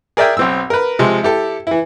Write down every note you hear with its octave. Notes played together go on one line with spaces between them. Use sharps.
G#4 A#4 D5 E5 G5 G#5
B1 C4 E6
A#4 B4
C3 F3 G#3
E4 G4 A4
E3 E4